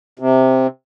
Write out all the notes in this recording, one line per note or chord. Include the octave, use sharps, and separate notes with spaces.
C3